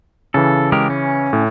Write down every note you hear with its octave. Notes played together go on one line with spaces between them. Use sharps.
C#3 E3 A4
G#3 G4 A#4
C#4
A2